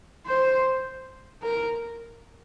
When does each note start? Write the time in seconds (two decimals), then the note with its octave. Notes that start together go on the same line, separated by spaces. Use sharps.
0.27 C5
1.43 A#4